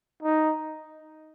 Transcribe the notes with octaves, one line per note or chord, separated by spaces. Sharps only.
D#4